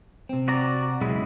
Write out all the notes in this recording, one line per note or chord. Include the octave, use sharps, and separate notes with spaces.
C3 C4
F#4 D5 A#5
B1 C#3 G#3 E4